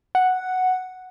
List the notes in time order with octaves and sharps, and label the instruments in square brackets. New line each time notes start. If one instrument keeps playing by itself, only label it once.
[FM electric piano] F#5